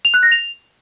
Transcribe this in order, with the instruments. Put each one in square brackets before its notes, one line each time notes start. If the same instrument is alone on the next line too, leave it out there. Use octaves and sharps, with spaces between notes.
[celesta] F7
F#6
A#6
F7